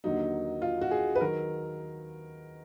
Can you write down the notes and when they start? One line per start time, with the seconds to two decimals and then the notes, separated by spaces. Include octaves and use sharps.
0.04 D#2 D3 F#3 D#4
0.62 F4
0.81 F#4
0.91 G#4
1.15 B4
1.21 D#3 F#3 A#4